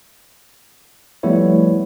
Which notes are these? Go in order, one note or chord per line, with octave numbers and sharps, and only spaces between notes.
F3 G3 A3 B3 E4 C#5